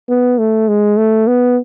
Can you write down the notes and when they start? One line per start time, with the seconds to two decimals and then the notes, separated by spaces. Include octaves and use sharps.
0.09 B3
0.38 A3
0.68 G#3
0.97 A3
1.27 B3